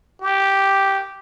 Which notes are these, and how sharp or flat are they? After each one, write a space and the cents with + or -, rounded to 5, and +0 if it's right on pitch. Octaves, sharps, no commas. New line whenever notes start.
G4 -5